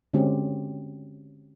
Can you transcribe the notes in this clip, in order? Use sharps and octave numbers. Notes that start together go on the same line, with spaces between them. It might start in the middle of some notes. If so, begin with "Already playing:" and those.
D3 G#3 C4 C#4 F#4 G4